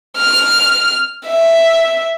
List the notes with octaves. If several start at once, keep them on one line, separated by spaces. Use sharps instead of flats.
F6
E5